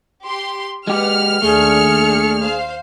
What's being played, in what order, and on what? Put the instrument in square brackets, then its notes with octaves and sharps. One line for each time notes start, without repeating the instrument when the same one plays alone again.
[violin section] G4 C6
[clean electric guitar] G#3 G4 [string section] B4 F#5 [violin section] F6
[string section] D#2 D4 C#7 [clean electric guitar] A3 [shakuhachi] G#4
[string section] C5 F5